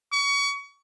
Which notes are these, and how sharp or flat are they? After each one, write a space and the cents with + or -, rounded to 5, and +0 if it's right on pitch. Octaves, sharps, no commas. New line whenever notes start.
C#6 +30